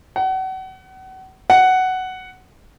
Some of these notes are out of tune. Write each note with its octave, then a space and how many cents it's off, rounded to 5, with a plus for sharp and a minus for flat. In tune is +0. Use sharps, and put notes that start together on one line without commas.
F#5 +35
F#5 +10